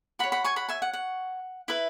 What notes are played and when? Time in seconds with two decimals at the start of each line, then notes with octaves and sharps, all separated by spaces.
0.19 F#4 F#5 B5
0.24 C#5
0.32 F#5 B5
0.44 G#5 C#6
0.56 F#5 B5
0.69 E5 G#5
0.82 F#5
0.93 F#5
1.68 E4 B4 E5